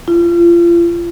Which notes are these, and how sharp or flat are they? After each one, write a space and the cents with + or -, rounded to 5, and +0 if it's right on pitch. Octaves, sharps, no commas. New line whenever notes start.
F4 -35